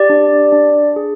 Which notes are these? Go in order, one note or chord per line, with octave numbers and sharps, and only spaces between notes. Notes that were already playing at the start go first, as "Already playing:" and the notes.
Already playing: G4 D5
D4
D4
G#4